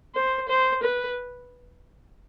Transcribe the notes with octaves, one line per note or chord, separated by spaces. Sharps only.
C5
C5
B4